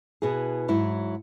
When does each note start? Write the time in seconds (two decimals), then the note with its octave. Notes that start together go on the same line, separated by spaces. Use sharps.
0.22 B2 B3 E4 G#4
0.68 G#2 F#3 E4